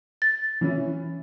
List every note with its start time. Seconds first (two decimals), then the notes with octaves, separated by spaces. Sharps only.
0.22 A6
0.61 E3 C#4 E4